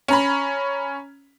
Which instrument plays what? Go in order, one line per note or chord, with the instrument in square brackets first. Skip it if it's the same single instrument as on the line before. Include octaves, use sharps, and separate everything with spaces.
[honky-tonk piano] C#4 A#5 B5